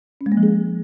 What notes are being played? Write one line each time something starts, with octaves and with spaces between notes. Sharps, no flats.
C#4
G#3
A#3
F3
G#4